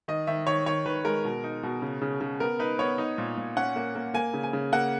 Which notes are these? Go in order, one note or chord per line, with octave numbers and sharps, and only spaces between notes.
D#3 D#5
D#3 E5
D#3 C#5
D#3 C#5
D#3 B4
G#3 A#4
B2
D#4
B2
C#3
C#3
C#3
B3 A#4
D#4 B4
B3 C#5
D#4
A#2
A#2
C#4 F#5
A#3
A#3
A#3 G#5
C#3
G#5
C#3
A#3 F#5